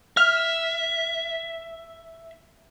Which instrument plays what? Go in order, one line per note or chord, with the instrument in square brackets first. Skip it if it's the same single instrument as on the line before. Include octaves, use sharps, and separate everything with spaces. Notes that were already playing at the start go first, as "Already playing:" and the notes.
[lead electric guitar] E5 [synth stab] F6